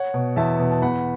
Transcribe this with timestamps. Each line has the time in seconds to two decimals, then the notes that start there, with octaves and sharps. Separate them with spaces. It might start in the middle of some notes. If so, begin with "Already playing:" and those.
Already playing: C#5 F#5
0.14 B2
0.36 E2 E5 A5
0.59 B2
0.72 A5
0.82 E2 F#5 B5